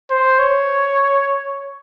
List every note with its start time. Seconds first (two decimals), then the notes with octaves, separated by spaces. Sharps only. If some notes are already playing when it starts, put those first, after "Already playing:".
0.10 C5
0.39 C#5